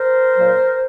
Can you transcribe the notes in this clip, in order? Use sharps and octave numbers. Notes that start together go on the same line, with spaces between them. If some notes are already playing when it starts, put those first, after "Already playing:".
Already playing: A#4 C5
A#2 F#3